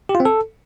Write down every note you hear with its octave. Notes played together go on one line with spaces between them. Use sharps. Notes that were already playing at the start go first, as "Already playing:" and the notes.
G4
F4
C4
A4